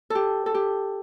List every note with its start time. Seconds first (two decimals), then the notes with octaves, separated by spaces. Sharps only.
0.10 G4 A4
0.46 A4
0.54 G4